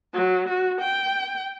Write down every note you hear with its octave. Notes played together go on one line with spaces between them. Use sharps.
F#3
F#4
G5